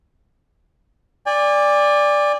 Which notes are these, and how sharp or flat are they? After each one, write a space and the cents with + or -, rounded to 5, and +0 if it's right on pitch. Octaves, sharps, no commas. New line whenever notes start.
D5 +0 G#5 -40